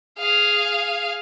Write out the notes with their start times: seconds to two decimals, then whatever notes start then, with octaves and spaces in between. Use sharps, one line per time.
0.18 G#4 F5